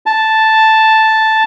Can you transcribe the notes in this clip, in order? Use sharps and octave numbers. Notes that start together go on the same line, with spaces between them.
A5